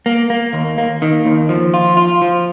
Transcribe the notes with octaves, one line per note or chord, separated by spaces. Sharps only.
A#3
A#3
D#2
A#3
D#3
D#2
F3
F4
F4
F3